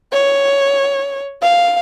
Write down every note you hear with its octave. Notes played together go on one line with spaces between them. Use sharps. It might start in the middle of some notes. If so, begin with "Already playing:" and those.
C#5
F5